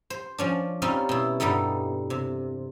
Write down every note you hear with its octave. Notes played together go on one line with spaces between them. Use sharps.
C5
F3 C#4 D4
G3 C4 C#4 D#4 F4
B2 E4
E2 G2 G3 D#4 A4
C3